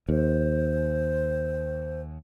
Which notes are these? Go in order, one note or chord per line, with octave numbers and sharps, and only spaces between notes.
D#2 C5